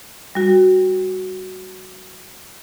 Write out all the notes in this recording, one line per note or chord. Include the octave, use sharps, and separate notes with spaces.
G3 F#4